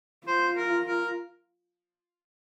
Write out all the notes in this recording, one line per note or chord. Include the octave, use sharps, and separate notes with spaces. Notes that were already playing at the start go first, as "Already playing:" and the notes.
F4 C5
A#4
A#4